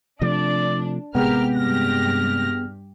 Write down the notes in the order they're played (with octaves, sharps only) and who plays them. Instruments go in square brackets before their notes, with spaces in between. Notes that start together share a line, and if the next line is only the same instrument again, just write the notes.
[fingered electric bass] C3 F3 A3 [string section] D4 [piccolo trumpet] D5
[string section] A1 G4 F6 [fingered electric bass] C3 G#3 [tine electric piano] B3 G#4 [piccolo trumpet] A#4
[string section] G2 G4 A#6 [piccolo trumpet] F6